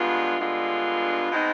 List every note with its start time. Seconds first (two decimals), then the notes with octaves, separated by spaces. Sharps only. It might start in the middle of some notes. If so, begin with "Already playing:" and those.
Already playing: G2 D3 G#3 B3 F4
0.39 G2 D3 G#3 B3 F4
1.30 B2 G#3 C4 D#4